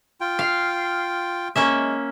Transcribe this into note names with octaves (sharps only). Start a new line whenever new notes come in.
F4 G5
F5
G#3 A#3 C#4 E5